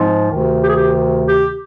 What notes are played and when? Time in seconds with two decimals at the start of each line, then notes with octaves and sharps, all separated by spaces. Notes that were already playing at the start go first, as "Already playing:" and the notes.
Already playing: G#2 F3 G#3 C4
0.30 D2 C3 D#3
0.63 G4
0.69 G#4
0.77 G4
1.26 G4